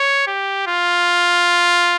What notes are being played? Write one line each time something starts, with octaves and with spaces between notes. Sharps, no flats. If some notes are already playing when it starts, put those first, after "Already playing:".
Already playing: C#5
G4
F4